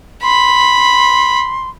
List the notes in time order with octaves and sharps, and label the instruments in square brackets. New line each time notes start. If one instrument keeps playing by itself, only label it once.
[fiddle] B5 [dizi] C6